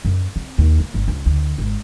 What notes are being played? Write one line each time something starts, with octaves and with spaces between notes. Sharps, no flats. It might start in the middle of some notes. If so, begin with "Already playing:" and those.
F#2
C4
D#2
A#3
G1
C#2
D2
G#1